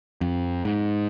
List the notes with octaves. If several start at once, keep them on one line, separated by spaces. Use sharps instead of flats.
F2
G#2